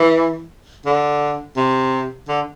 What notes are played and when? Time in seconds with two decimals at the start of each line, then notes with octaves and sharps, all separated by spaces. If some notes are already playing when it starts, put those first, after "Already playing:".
Already playing: E3
0.86 D3
1.57 C3
2.28 D3